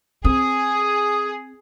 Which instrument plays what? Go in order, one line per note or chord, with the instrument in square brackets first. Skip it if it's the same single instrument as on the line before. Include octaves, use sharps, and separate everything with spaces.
[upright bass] C4 [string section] G#4 [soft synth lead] D#6